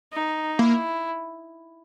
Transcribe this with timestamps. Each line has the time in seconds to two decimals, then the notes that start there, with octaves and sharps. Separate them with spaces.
0.13 D#4
0.59 A#3 E4